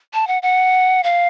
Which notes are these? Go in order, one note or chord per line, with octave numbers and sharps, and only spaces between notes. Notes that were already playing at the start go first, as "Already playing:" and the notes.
A5
F#5
F#5
F5